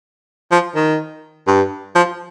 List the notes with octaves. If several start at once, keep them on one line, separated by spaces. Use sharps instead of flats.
F3
D#3
G2
F3